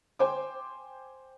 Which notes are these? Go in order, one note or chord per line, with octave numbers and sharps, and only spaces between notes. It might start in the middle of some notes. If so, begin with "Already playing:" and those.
C5 G5 G#5 D6